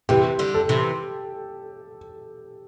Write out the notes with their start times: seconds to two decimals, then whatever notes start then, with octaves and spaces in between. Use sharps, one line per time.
0.09 C3 E3 G4
0.39 D3 G3
0.54 A4
0.69 C3 E3